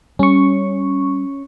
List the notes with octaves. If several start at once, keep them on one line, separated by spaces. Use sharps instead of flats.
G3 C#4 C#6